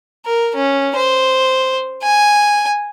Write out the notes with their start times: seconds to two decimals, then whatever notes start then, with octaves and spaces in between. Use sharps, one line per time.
0.26 A#4
0.55 C#4
0.96 C5
2.03 G#5